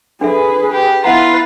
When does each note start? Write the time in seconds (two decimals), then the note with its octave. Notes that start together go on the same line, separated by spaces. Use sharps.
0.21 D4 G#4 A4 B4 E5
0.71 G4
1.04 B3 E4 F4 B4 E5 F#5 A#5